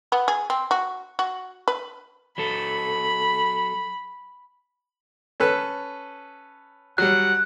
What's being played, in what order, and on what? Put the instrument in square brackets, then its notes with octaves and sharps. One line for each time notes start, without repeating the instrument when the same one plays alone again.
[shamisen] B3
G#4
C4
F#4
F#4
B4
[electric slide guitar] F#3 A4 [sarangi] B5
[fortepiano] C#4 A4 B4
[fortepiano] F#3 G3 [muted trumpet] F#5 [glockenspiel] F#6